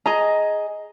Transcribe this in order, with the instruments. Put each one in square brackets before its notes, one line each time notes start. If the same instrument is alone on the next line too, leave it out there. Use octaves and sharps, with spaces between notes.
[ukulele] G#4 D#5 A#5